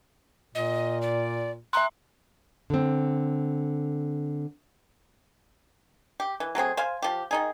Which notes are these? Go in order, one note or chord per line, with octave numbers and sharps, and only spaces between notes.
A#2 D#5
D5
E5 A#5 C6 F#6
D3 C4
G4
E3
F#3 A3 C4 G#4
C5 F5 G#5
F3 G4
D#3 D#4 G#4